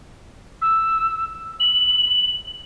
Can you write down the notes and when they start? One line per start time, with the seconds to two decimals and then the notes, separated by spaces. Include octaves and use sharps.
0.61 E6
1.59 F#7